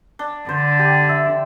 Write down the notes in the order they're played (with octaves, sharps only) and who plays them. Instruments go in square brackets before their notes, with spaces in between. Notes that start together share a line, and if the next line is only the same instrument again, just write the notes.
[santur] D4
[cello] D3 [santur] C5
[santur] G4
E5